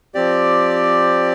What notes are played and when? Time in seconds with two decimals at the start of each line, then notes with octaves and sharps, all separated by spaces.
0.14 F3 C4 G4 D5